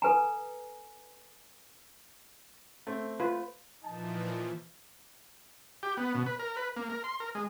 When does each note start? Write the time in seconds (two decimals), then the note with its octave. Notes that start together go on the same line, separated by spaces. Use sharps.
0.02 A4 B4 G#5 A#5
2.87 A3 C4
3.20 F4 B4
3.84 A#2 E3 F3 D#4 A5
5.83 G4
5.97 B3
6.15 B2
6.26 B4
6.40 A#4
6.57 B4
6.77 A#3
6.90 A#4
7.04 C6
7.20 A#4
7.35 G#3